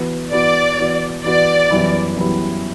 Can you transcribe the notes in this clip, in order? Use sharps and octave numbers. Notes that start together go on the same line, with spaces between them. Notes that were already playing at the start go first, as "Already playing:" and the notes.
Already playing: E3 B3 F#4
E3 B3 F#4 D5
E3 B3 F#4
E3 B3 F#4 D5
F#2 E3 G3 B3 E4
F#2 E3 G3 B3 E4